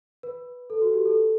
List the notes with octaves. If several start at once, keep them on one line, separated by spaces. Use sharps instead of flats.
B4
A4
F#4
G4
A4